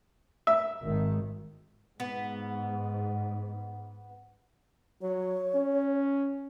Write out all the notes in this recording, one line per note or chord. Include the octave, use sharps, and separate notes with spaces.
E5
G#1 D#3
G#2 B3
F#3 C#5
C#4